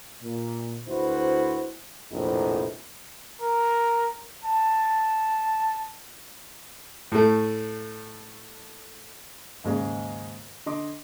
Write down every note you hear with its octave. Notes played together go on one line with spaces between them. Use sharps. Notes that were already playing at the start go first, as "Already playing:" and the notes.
A#2
D2 E4 F#4 B4 C5
A#1 F2 A2 C3 E3 D#4
A#4
A5
A2 A3
D#2 G#2 C#3 G#3
D3 D#5 C6 D6